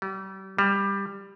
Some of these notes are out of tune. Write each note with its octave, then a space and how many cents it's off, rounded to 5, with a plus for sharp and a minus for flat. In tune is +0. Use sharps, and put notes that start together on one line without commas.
G3 -35
G3 +15